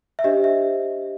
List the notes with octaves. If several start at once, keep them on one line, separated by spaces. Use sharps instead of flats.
E5
D4 G4 C5 D#5
E5